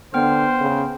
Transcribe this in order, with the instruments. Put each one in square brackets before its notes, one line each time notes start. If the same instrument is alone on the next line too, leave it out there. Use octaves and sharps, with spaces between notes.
[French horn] D3 [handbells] B3 G5 F6 [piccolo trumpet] C5
[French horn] C#3